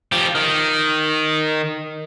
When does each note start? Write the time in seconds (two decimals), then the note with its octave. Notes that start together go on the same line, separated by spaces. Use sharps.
0.12 F3 G4
0.35 D#3